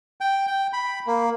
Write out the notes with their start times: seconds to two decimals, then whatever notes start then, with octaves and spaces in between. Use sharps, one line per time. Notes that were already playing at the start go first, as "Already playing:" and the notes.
0.21 G5
0.47 G5
0.73 B5
1.07 A#3